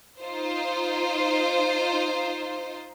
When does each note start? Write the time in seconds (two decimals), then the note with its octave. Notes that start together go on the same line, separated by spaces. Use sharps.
0.21 D#4 F4 C5